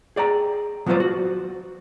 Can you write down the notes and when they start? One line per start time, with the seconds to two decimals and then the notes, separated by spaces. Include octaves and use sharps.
0.16 G#4 D5 G5 A#5
0.86 F3 F#3 B3 F4 C5 D5
1.00 F#4